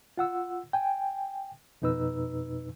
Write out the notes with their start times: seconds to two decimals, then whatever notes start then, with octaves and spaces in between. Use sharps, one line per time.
0.18 F4 F#5 E6
0.73 G5 G#5
1.82 F2 B2 D#4 B4 E6